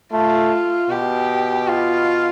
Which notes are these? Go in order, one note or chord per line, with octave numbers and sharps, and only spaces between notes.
A3 F4
B2 G4
F4